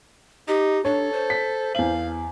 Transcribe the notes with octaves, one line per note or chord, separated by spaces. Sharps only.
D#4 G4
D4 A4 C#5
C5
B6
E2 F5 F#7